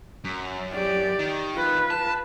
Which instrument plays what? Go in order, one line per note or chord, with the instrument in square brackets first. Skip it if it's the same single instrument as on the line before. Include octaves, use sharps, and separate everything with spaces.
[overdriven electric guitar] F#2
[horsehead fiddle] G4 D5
[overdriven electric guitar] D#3
[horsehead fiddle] F4 B4
[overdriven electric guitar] A5